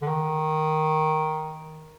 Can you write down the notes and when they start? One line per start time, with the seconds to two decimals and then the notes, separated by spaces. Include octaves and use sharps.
0.02 D3
0.08 D#3